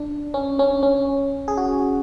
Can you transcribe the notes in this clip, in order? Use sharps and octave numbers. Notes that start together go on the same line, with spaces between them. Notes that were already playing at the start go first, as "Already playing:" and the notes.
Already playing: D4
C#4
C#4
C#4
G#4
F#4